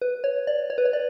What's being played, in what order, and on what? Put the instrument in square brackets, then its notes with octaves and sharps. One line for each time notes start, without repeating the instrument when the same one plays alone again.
[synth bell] B4
C#5
D5
C#5
B4
C#5
D5